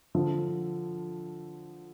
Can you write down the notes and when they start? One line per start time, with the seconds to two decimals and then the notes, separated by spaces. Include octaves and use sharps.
0.15 D3 F3